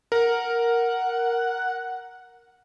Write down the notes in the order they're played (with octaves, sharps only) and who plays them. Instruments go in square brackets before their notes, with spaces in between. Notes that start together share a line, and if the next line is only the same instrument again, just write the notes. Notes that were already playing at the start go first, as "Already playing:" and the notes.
[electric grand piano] A#4 [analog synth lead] F#5